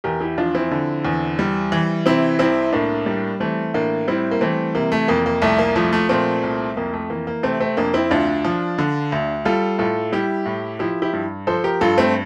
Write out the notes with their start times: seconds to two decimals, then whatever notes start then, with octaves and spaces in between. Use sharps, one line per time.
0.04 E2 G4 A#4
0.21 E4 G4
0.37 F3 D4 F4
0.55 C4 E4
0.71 D3
1.05 E2
1.39 G3
1.72 E3
2.06 C3 C4 E4
2.39 C2 C4 E4
2.73 A2 A#3 D4
3.06 G3
3.40 E3 A3 C4
3.74 A2 A#3 D4
4.08 G3 C4 E4
4.31 A#3
4.41 E3 A3 C4
4.75 C3 A#3
4.92 A3
5.08 F2 A#3
5.26 A#3
5.42 C2 A3
5.59 A#3
5.76 F3 A3
5.93 A3
6.09 A#2 A3 C4
6.43 C2
6.77 F2 A#3
6.93 A3
7.10 E3 A#3
7.27 A#3
7.43 C3 A3 C4
7.60 A3 C4
7.77 F2 A#3 D4
7.94 C4 E4
8.10 D2 D4 F4
8.45 F3
8.78 D3
9.12 D2
9.45 G3 F4 A4
9.79 A2 F4 A4
10.12 G3 E4 G4
10.46 A2
10.79 F3 E4 G4
11.02 E4 G4
11.13 G2
11.47 F3 A4 C5
11.64 G4 A#4
11.81 G2 F4 A4
11.98 A3 C4